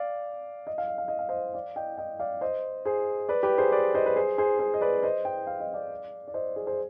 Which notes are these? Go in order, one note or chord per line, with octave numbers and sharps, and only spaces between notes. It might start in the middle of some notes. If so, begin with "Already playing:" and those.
Already playing: D5 F5
D#5
F5
D#5
F5
D#5
F5
C5 D#5
D5 F5
D#5 G5
D#5 G5
D5 F5
C5 D#5
G#4 C5
B4 D5
G4 B4
G#4 C5
B4 D5
C5 D#5
B4
G#4 C5
G#4 C5
G#4 C5
D#5
B4 D5
C5 D#5
D#5 G5
F5
D#5
D5 F5
D5
C5 D#5
G#4 C5
G#4 C5